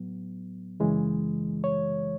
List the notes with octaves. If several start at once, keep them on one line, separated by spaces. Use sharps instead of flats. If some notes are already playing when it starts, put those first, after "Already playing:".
Already playing: A2 F#3 B3
F#2 C#3 E3 G#3
C#5